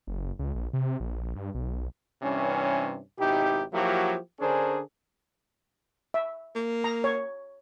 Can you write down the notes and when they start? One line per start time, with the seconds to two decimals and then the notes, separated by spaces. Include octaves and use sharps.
0.07 F#1
0.39 C#2
0.55 A#1
0.73 C3
1.00 A#1
1.36 G2
1.55 B1
2.22 G2 C3 E3 C#4
3.19 G#1 B2 D#4 E4 G4
3.73 F3 F#3 A#3 E4 F#4 G4
4.40 D3 C#4 D4 G#4 A#4 C5
6.14 E5
6.55 A#3
6.84 A#5
7.04 C#5